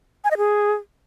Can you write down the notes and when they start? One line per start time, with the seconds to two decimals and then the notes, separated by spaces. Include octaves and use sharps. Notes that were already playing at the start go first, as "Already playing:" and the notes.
0.24 G#5
0.31 D#5
0.38 G#4